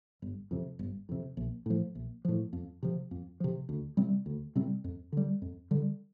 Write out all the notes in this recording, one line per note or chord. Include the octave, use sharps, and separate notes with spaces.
G1
F2 C3
G1
F2 C3
A#1
A2 F3
A#1
A2 F3
F2
C3 F3
F2
C3 F3
D2
C3 G3 C4
D2
C3 G3 C4
F2
D3 G3
F2
D3 G3